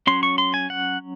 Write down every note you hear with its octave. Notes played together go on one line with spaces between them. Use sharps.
F#3 C#4 C6
C#6
C6
G#5
F#5